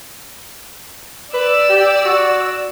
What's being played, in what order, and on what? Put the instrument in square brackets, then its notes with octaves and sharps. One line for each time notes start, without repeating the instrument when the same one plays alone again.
[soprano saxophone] B4 [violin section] D5 E6
[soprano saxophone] G4
F#4